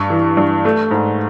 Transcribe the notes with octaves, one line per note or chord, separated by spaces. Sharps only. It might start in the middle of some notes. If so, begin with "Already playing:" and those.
Already playing: G2 C#6
E3
G2
A3
G#2